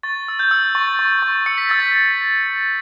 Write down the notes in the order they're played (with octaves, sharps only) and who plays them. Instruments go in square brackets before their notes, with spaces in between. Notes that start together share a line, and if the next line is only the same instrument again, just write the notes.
[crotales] C#6 A6
E6
G6
E6
C#6 A6
C#6
C#6
E6 C#7
B6
E6 A6
B6